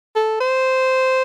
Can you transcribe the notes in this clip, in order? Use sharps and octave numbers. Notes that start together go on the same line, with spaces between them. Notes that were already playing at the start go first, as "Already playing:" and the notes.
A4
C5